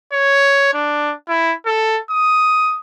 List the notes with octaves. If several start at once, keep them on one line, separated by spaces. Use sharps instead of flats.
C#5
D4
E4
A4
D#6